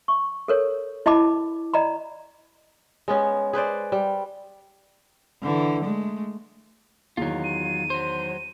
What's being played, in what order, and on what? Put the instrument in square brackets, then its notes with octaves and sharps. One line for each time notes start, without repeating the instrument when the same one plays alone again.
[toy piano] C#6
A4 A#4 C#5
E4 D#5 A5 B5 D6
D5 D#5 A#5 B5
[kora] G#3 B3 C#4
G#4 B4 C5 D5
G3
[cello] D3 E3
G#3 A3
[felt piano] E2 D#3 [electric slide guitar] F#3 F4
[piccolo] D#7
[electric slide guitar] F#3 C5